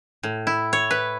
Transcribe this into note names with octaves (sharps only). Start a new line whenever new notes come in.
A2
E4
C#5
B4